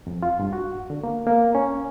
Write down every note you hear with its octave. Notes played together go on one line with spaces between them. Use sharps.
F2
F4
G2
F#4
D3
A#3
A#3
C#4